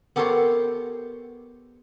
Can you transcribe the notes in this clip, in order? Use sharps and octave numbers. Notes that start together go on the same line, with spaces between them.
B3 G4 A4 A#4 C5 C#5